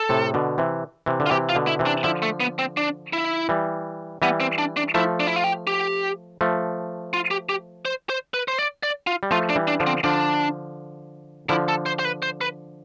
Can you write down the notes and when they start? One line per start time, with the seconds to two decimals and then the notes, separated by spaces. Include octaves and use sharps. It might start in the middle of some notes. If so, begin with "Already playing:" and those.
Already playing: A4
0.09 A2 C3
0.34 B2 D3
0.58 C3 E3
1.06 C3 E3
1.20 D3
1.26 F4
1.31 C3 E3 G4
1.49 F4
1.55 B2 D3
1.67 E4
1.79 C3 E3
1.86 D4
2.04 D3 F3 E4
2.22 A3
2.40 B3
2.59 C4
2.77 D4
3.13 E4
3.49 E3 G3
4.22 E3 G3 B3
4.40 C4
4.58 D4
4.77 D4
4.94 F3 A3 E4
5.20 D4
5.27 E4
5.36 F4
5.44 G4
5.67 G4
6.41 F3 A3
7.14 F4
7.31 G4
7.49 G4
7.85 C5
8.10 C5
8.34 B4
8.48 C5
8.59 D5
8.83 D5
9.07 F4
9.23 G3
9.31 F3 A3 F4
9.50 D4
9.56 E3 G3
9.68 D4
9.80 D3 F3
9.87 C4
10.04 D3 F3 D4
11.49 D3 F3 E4
11.68 A4
11.86 C5
11.99 C5
12.05 B4
12.23 C5
12.41 B4